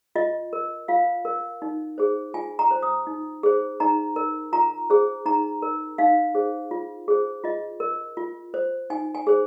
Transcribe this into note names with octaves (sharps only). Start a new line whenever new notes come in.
F4 D#5
A#4
F4 F5
A#4
D#4
G#4 C5
F4 G#5
A#5
C5
D#6
D#4
G#4 C5
D#4 A#5
A#4
F4 A#5
G#4 C5
D#4 A#5
A#4
D#4 F5
G#4 C5
F4
G#4 C5
F4 D#5
A#4
F4
C5
D#4 G#5
G#5
G#4 C5